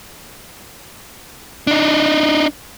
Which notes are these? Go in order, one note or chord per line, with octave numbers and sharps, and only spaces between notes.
D4 D#4